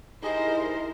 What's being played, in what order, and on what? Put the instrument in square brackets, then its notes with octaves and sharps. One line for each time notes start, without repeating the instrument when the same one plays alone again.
[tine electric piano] D#4 G4 G#4 [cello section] E4 A#4 C5 [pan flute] D#5